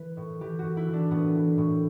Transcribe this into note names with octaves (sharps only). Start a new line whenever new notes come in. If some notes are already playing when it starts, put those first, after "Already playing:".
Already playing: E3 B4
A2
E3 G4
F#4
A2
E4
E3
D4
A2 B3
E3
A2